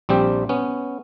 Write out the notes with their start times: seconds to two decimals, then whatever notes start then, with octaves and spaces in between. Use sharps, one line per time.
0.09 A#1 G3 C4 G4
0.49 B3 C#4